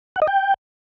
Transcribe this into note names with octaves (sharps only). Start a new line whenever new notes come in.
F#5
D#5
G5